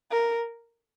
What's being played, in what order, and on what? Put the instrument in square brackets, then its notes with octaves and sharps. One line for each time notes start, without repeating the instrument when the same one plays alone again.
[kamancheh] A#4